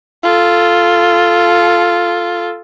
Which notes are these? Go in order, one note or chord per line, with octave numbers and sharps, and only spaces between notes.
F4 A4